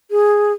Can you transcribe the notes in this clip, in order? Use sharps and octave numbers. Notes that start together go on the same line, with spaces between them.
G#4